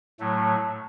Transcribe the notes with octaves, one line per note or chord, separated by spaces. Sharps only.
A2 F#3 A3